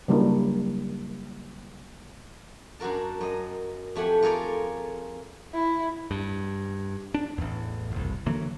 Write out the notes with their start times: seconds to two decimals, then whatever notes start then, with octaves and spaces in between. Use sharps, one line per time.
0.08 C#3 F#3 G3 A#3 D4 E4
2.80 F#2 D4 F#4 A#4 A5
3.21 F#2 D#5
3.96 F2 A3 G4 F#5 G#5
4.22 F4 G#4 A#4 C#5 D5
5.54 E4
6.11 G2
7.14 D4
7.38 A1 E2
7.92 F#1 C2
8.26 D3 E3 F#3 A#3